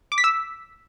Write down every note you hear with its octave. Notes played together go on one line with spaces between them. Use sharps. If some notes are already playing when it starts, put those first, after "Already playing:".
D6
B6
E6